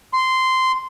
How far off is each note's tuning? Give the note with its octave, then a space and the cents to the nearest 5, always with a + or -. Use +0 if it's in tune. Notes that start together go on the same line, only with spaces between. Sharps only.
C6 -10